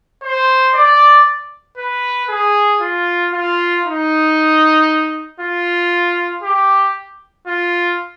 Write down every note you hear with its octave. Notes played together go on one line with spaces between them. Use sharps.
C5
D5
B4
G#4
F4
F4
D#4
F4
G4
F4